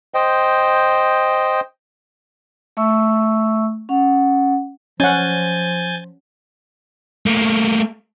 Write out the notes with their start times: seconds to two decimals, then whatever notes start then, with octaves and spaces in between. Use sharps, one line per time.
0.14 C5 D#5 G5
2.77 A3 E5 C#6 E6
3.89 C#4 F#5
5.00 F3 C#4 F#5 G#5 G6 A6
7.26 A3 A#3